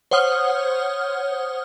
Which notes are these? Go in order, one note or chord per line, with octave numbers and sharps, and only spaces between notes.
C5 C#5 F#5 D#6 F6